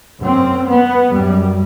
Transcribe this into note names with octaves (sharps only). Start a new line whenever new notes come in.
F#2 C4
B3
F#2 G3